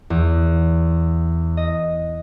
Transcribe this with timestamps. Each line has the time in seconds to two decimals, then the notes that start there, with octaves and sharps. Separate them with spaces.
0.10 E2
1.57 D#5